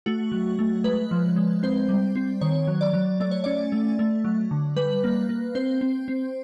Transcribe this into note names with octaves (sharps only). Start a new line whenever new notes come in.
A3 F#4
F#3
A3
G#3 B4
F3
G#3
C4 C5
G3
C4
D#3 C#5
F#3
D5
F#3
A3 D5
C#5
C#4 D5
A3
A3
F#3
D3
G3 B4
A#3
A#3
C4 C5
C4
C4